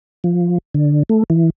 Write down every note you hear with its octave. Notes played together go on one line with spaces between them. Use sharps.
F3
D3
A3
E3